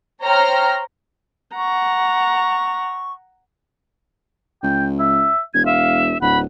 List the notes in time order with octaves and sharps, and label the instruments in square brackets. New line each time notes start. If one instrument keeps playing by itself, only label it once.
[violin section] C5 C#5 G5 A#5 F6 A#6
[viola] F#5 A#5 [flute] C#6
[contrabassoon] C#2 [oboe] G5
[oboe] E5
[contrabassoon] E1 [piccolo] G#6
[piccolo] E5 [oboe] F5
[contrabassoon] D1 [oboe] F#5 [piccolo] B5